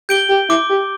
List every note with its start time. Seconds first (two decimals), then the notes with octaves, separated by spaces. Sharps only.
0.09 G4 G6 D7 G7
0.29 G4
0.49 E4 D6
0.69 G4